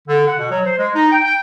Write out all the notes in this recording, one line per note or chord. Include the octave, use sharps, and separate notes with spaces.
D3
F#5
B2
F#3
C5
G#3
D#4
G5
G5